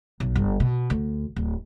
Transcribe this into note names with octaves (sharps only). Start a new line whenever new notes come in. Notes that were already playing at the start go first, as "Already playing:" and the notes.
B1
G1
B2
D2
D1